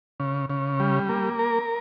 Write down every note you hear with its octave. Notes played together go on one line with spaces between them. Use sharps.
C#3
C#3
G3
A#3
A#4